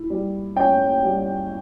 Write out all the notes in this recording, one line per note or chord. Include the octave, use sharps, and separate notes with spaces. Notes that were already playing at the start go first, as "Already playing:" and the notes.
Already playing: E4
G3
C#4 G5
G3